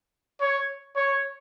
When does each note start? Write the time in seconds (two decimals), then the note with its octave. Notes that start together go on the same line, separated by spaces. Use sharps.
0.40 C#5
0.96 C#5